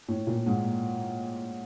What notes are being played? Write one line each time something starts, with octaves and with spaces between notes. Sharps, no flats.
A2
A#2
G#2